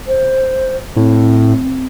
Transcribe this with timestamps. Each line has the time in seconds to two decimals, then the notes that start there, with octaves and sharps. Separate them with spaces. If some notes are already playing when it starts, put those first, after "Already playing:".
0.08 C5
0.96 A2 C4